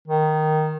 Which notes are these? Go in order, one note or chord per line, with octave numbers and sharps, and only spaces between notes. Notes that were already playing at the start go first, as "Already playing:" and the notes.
D#3